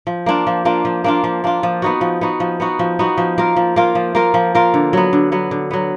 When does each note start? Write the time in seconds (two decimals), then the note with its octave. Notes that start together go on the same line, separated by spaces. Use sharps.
0.07 F3
0.26 A#3 D4 F4
0.47 F3
0.65 A#3 D4 F4
0.85 F3
1.04 A#3 D4 F4
1.24 F3
1.44 A#3 D4 F4
1.63 F3
1.82 B3 D#4 F#4
2.01 F3
2.21 B3 D#4 F#4
2.40 F3
2.60 B3 D#4 F#4
2.79 F3
2.99 B3 D#4 F#4
3.18 F3
3.38 A#3 F4 A#4
3.56 F3
3.76 A#3 F4 A#4
3.95 F3
4.15 A#3 F4 A#4
4.34 F3
4.55 A#3 F4 A#4
4.74 D3
4.93 F#3 B3
5.13 D3
5.32 F#3 B3
5.51 D3
5.71 F#3 B3